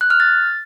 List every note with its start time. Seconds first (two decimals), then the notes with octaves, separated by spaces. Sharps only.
0.01 F#6
0.10 F6
0.20 A6